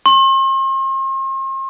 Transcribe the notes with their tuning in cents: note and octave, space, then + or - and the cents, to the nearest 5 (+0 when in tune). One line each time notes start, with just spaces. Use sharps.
C6 +45